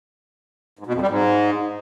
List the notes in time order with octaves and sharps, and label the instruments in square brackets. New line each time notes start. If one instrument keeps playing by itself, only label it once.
[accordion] G#2
B2
F2
G3
G#2